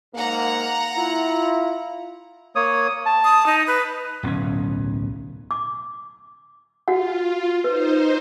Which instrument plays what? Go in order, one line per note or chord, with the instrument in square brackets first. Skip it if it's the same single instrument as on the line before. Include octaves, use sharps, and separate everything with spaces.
[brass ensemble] G#2 A#3 [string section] F#5 A#5
[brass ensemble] E4 F4
[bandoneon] A#3 C#5 D#6
A5
[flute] D#6
D#4
B4
[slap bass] D1 B1 C4 C#4
[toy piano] D6
[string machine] F4 [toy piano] F#4 F#5
[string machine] D#4 C5 [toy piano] B4